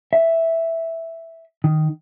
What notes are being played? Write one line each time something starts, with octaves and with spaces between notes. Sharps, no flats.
E5
D#3